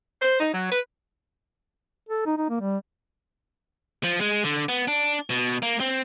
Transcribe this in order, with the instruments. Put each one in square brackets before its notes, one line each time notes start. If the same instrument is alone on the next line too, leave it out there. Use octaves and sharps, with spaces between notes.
[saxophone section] C5
D#4
F#3
B4
[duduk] A4
D#4
D#4
A#3
G3
[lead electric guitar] F3
G#3
D3
B3
D4
B2
A#3
C4